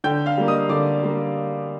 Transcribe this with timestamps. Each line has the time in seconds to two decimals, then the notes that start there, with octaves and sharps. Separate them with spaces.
0.04 D3 G5 G6
0.26 F5 F6
0.37 G3 A#3
0.48 D#5 D#6
0.69 D3 D5 D6
1.03 G3 A#3